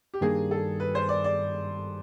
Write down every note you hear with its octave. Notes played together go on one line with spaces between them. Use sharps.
G4
G2 D#3 G3 A#3 D4 G#4
A4
B4
C5
D5
D5